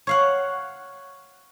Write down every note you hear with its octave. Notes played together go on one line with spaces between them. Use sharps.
C#5 F5 F#5